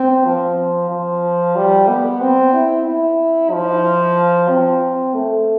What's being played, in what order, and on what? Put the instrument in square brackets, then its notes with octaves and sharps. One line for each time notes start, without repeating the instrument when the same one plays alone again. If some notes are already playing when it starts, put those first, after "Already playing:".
Already playing: [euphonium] C4
F3
F3
G3
B3
C4
E4
E4
F3
C4
A3